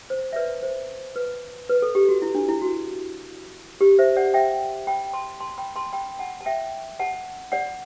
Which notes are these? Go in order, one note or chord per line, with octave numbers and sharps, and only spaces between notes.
C5
E5
B4 D5
C5
B4
B4
A4
G4
F#4
E4
D4
E4
F#4
G4
C5 E5
D5 F#5
E5 G5
G5 B5
A5 C6
A5 C6
G5 B5
A5 C6
G5 B5
F#5 A5
A5
E5 G5
F#5 A5
D5 F#5